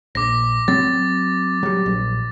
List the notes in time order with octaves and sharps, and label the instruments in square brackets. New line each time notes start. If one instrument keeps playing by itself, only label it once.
[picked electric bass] A#1 [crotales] D6 A#6
[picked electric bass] F#3 C4 [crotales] A6
[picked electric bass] F#3 G3
A#1